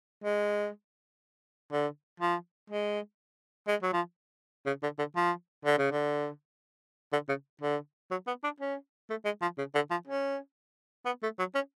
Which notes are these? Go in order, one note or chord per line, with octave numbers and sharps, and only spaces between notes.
G#3
D3
F3
G#3
G#3
F#3
F3
C#3
D3
D3
F3
D3
C#3
D3
D3
C#3
D3
F#3
B3
D4
C#4
A3
G#3
F3
C#3
D3
F3
C#4
B3
A3
F#3
C#4